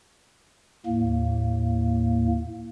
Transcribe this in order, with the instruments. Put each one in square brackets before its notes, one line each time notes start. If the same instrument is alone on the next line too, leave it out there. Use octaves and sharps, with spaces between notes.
[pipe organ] D#2 A2 A#3